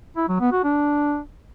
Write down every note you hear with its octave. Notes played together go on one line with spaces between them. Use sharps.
E4
F#3
B3
F#4
D4